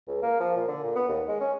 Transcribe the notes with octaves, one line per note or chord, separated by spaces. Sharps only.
C#2
A#3
F3
A#2
D3
A#2
B3
D#2
G#3
C#4